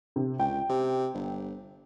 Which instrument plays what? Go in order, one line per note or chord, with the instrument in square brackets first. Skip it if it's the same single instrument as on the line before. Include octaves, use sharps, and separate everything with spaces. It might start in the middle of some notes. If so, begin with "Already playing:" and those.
[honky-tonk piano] C3
[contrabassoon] C#2 [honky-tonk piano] G5
[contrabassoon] C3
G1